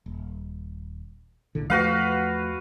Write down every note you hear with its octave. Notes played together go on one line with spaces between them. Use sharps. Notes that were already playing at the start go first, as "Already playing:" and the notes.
D#1
A#1 A2 D3
E2 F3 A3 F#4 B4 F5